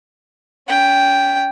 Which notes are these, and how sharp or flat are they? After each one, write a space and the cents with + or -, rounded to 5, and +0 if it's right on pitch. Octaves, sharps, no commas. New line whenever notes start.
C#4 +35 G5 +0